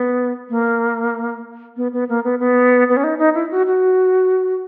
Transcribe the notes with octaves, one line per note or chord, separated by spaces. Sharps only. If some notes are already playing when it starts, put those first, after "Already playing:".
Already playing: B3
A#3
B3
B3
A#3
B3
B3
B3
C#4
D#4
D#4
E4
F#4
F#4